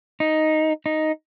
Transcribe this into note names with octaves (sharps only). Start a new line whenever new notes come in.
D#4
D#4